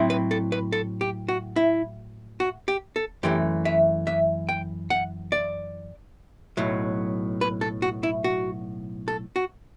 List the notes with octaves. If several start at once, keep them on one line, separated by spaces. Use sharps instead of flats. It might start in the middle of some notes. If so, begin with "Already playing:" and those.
Already playing: A2 F#3 C4 E4
B4
A4
B4
A4
G4
F#4
E4
F#4
G4
A4
F#2 E3 A3 G4
E5
E5
G5
F#5
D5
B1 A2 F#3
B4
A4
F#4
E4
F#4
A4
F#4